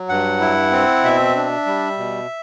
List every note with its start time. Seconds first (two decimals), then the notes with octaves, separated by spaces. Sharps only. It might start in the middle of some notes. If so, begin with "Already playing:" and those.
Already playing: F#3
0.09 G2 F#5
0.41 E4
0.72 C4
1.03 B2 E5
1.35 D4
1.66 G3
1.98 B2